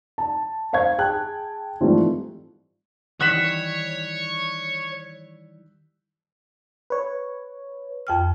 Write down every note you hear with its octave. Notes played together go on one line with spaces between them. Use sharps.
A5
C5 F5 C#6 G#6
G#4 G5 A5 F#6
G#2 E3 F3 G3 A3 C4
D#3 E3 G3 C#5 F#6 B6 E7
B4 C#5
F2 G5 F6